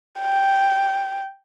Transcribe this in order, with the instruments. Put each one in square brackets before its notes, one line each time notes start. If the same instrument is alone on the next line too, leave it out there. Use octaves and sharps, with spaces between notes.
[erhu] G5